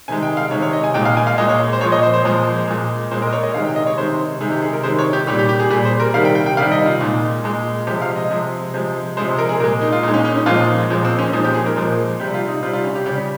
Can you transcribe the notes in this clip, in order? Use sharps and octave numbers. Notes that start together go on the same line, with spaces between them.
C3 D#3 G#3 G#5
G5
F5
C3 D#3 G#3 C#5
C#5
D#5
G#5
A#2 G#3 G5
F5
G#5
F5
A#2 G#3 D#5
C#5
C5
A#2 F3 G#3 C#5
D#5
C5
C5
A#2 F3 G#3
A#2 G#3
A#2 G#3 C5
A#4
D#5
C#5
D#5
C3 D#3 G#3 F5
G5
D#5
C#5
C3 D#3 G#3 C5
C3 D#3 G#3 G#4
G4
G#4
A#4
C3 D#3 G#3 C5
C#5
G4
A#2 G3 G4
G4
G4
G#4
A#2 G3 G#4
C5
A#4
C3 D#3 G3 F5
G5
G5
G5
C3 D#3 G3 F5
D#5
F4
A#2 G#3
A#2 G#3
C3 F3 G#3 G4
F5
D#5
C3 F3 G#3
C3 F3 G#3
C3 F3 G#3 C5
A#4
G#4
A#2 G#3 A#4
D#4
F4
A#2 G#3 D#4
C#4
C#4
D#4
A#2 F3 G#3 F4
A#2 F3 G#3
C4
C#4
A#2 F3 G#3 D#4
G4
G#4
A#4
A#2 F3 G#3
C3 G3 G4
F4
D#4
C3 G3 F4
F4
C#4
G4
C#3 G3 G4